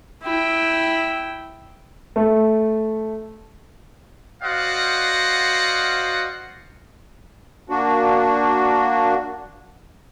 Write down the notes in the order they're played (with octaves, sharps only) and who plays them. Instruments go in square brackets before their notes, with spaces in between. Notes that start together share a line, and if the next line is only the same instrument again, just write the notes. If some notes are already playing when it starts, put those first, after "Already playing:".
[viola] E4 G5
[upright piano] A3
[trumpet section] F#4 C5 D5 D#5 F5 F#5
[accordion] A#3 D4 F#4